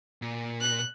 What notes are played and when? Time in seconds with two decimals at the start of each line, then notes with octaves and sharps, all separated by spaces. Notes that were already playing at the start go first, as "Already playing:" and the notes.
0.22 A#2
0.61 F#6